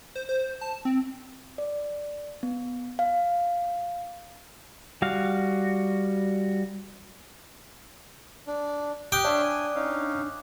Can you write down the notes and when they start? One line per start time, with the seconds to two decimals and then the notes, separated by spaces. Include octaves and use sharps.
0.15 C5
0.29 C5
0.61 A5
0.85 C4
1.58 D5
2.43 B3
2.99 F5
5.02 G3 F#4 F5
8.47 D4
9.12 G4 G5 D6 D#6 F#6
9.25 D4 C#5 E5 F5
9.42 G#5
9.75 C#4 D#4 F5